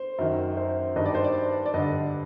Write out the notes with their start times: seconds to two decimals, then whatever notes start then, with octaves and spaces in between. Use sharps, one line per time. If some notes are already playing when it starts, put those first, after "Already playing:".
Already playing: C5
0.18 F#2 D#3
0.57 C5
0.96 G2 D#3 D#5
1.06 D5
1.15 C5
1.24 D5
1.66 D5
1.74 G2 D3 D#5